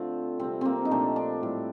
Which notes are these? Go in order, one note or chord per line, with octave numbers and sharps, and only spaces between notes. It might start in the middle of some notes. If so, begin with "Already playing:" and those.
Already playing: D3 A3 C4 F4
C3 G3 C4
A#3 C4
D#4
A#2 F3 A3 D4
D4
A2 G3